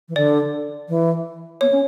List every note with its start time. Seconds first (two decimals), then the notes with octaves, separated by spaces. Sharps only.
0.09 E3
0.16 D3 D5
0.89 E3
1.61 B3 C#5
1.72 C#4